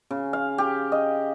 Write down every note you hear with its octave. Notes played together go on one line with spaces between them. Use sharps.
C#3
F5
G4
D#5